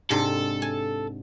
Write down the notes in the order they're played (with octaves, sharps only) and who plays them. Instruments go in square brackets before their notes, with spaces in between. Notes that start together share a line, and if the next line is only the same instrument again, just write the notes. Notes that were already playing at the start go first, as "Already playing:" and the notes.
[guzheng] G#2 C3 D4 [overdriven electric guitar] A4
[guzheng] G#5